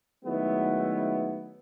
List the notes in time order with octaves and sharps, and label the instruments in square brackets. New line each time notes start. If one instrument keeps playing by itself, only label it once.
[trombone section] D#3 F#3 G#3 A3 B3 E4